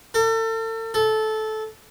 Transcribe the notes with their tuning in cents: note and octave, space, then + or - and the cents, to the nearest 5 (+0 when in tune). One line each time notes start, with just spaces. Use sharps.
A4 +40
A4 -15